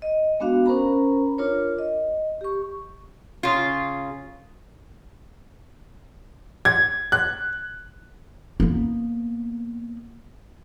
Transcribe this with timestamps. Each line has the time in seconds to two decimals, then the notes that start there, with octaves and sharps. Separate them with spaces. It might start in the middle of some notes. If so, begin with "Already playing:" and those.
0.02 D#5
0.40 G#3 B3 D4 F#4 F5
0.66 C#4 A#4 C5 A#5 B5
1.38 D4 F4 A#4 C#5
1.78 D#5
2.41 G4 C#6
3.43 C#3 F4
6.65 G#6
7.12 F#6
8.60 A#3 B3